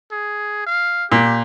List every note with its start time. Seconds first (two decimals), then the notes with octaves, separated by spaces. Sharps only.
0.11 G#4
0.67 F5
1.12 A#2 G4